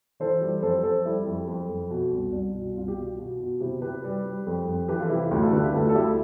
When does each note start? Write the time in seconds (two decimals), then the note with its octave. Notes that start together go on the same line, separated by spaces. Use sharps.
0.20 E3 A4 C5
0.41 G3
0.62 F2 A4 C5
0.83 F2 A4 C5
1.05 G3 E4
1.26 F2
1.48 F2
1.69 F2
1.90 B2
2.11 C2
2.33 C2
2.54 B2
2.76 C2 F4
2.88 G4
2.97 B2 F4
3.18 B2
3.40 B2
3.60 C3 E4 G4
3.82 C3 G4 B4
4.04 G3
4.25 G3
4.47 F2
4.68 F2
4.88 E3 G4 B4
5.00 F4 A4
5.10 C3 E4 G4
5.20 F4
5.31 D2 E4 G4
5.42 F4 A4
5.52 D3 G4 B4
5.63 E4 G4
5.74 D2 F4 A4
5.89 A4
5.95 D2 E4 G4